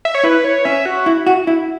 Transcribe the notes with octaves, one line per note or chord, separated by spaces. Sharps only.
E5
C#5
E4 B4
C#5
C#4 E5
F#4
E4
F#4
E4